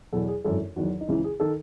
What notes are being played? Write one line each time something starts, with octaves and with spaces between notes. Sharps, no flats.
E2 B2 F#3 A4
G#4
G#1 F#2 E3 A4
E2 D#3 F#3 F#4
D#4
C#2 C#3 E3 E4
G#4
D#3 A4